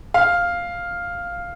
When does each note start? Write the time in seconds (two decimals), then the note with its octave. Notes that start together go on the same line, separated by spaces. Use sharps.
0.14 F5